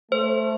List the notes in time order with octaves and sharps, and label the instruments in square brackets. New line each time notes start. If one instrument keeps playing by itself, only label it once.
[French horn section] A3 [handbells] C5